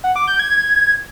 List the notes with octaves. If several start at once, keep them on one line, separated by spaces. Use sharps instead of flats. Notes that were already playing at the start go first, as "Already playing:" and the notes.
F#5
D6
G6
G#6